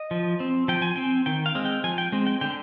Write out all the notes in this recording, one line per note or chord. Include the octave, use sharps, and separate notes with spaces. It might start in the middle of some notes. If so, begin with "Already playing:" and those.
Already playing: D#5
F3
C4
F3 G5
G#5
C4 G5
D#3 G5
F5
G#3 C4
G5
F3 G#5
G5
G#3 C4
G5
D3 G5